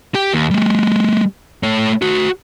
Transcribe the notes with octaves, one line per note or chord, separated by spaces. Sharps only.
G4 G5
D#2
G3 A3
A3 C#5
F#4 C5